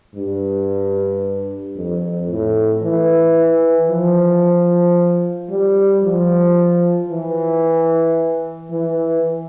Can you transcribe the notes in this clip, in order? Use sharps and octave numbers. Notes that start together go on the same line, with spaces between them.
G2
F2
A2
E3
F3
G3
F3
E3
E3